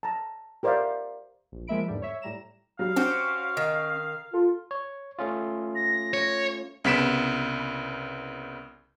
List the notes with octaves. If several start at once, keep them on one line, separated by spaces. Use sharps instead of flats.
A5 A#5
G4 A#4 C5 D5 E5 F5
A#1
F3 G#3 A#3 E5 B5 D7
E2 G#2 D3 G3
C#5 E5
A2 G3 A#5 E7
F#3 G3 F5
C#4 F#4 G4 C5
D#3
F4 A4
C#5
A3 C#4 F4
A#6
C#5
C2 C#3 B3 B6 D7 E7